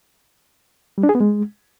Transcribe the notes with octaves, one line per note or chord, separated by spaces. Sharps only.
G3
D4
G#4
B3
G#3